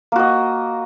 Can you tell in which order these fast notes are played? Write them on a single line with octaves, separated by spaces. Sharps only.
A#3 F#4 D#5